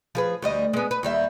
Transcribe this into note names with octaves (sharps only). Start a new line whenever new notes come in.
F3 G#4 B4
D2 G3 D#5
G#3 B3
B4
D#2 G3 E5